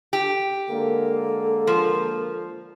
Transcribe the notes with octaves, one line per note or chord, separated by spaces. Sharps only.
G4
D3 G#3 A#3 A4
F3